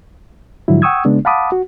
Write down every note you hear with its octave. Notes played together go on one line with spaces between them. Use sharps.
G#2 D3 F3 F#3 E4
F#5 G5 C#6 D#6 E6 G#6
C#3 G#3 B3 D4
F5 F#5 A5 B5 D6 D#6
F#4